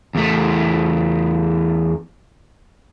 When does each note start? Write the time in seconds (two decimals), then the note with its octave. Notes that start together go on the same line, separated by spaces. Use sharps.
0.15 E2 A3